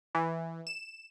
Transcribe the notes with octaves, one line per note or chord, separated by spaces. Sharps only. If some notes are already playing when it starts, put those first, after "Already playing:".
E3
E7